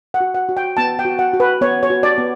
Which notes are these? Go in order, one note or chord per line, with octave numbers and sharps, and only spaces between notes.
F#5
F#4
F#5
F#4
G5
B3 A5
G5
F#4
F#5
F#4
B4
B3 C#5
C#5
F#4
D5
B3